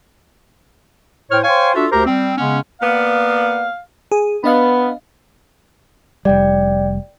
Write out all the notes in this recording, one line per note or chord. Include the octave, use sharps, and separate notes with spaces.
A2 C5 C#5 G5 F6
C5 C#5 F5 G5 G#5
D4 F4 F#4 A4 E5
D2 G4 A#4 C5 A#5
G3 C4
C#3 G#3 B3 C#4
A#3 B3 D5 F5
G#4
B3 D4 D#5 F5
F1 G3 D5 G5